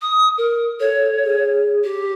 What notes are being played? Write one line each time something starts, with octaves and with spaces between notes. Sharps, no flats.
D#6
A#4
A4 C#5
G#4
G4